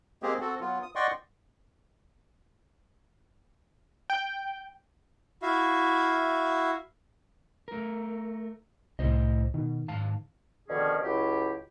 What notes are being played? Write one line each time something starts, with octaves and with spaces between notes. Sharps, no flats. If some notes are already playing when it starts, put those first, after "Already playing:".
G#3 A#3 C4 G4 G#4
C4 F#4 A4
F#3 B3 F4
D#6
D5 D#5 F#5 G5 C6 C#6
G5
E4 F#4 E5 F5
A3 A#4
C2 A2 C5 D#5
B2 D#3
G#2 F5 A5
B2 D3 D#3 F3 C#4 G#4
C#2 F#3 E4 F4 G4